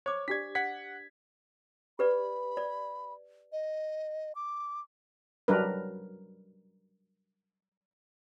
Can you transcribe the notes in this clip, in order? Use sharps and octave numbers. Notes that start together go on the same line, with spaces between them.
C5 C#5 D6
D4 G4 D5 G#6 B6
F#5 G#6 B6
G4 B4 D5 B5
D5
D#5
D6
F#3 G3 D4 A#4 B4